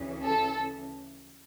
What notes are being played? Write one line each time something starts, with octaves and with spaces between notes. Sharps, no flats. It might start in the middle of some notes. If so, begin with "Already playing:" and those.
Already playing: D2 C#3 E3
A4